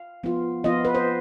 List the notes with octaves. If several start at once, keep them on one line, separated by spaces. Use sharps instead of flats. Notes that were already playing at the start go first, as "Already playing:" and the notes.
Already playing: F5
F3 B3 F4
F3 B3 F4 D#5
B4
C5